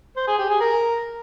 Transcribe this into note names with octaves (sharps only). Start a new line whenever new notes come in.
C5
G#4
G4
G#4
A#4